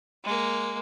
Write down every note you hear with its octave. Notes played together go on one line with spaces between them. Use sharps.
G#3 A#3